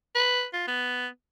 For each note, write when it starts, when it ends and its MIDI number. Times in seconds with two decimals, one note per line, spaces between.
0.15 0.45 71
0.53 0.66 65
0.67 1.07 59